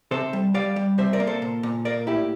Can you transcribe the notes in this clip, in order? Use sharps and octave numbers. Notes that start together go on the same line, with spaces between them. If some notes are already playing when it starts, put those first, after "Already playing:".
C3 A4 C5
G3
G3 D5 F5
G3
C3 C5 E5
A#4 D5
A#3
A4 C5
A#2
A#2
A#3 A#4 D5
A2 E4 G4